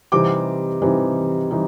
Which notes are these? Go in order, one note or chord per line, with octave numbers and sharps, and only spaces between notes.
C3 E3 G3 C4 D#4 D6
C3 E3 G3 C4 D#4
E3 G3 C4 D#4